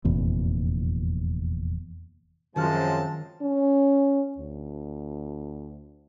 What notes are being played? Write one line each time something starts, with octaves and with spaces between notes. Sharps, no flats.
F1 E2 A#2
F#2 C3 D#3 F3 G#3 F#4 A5 F6
C#4
D2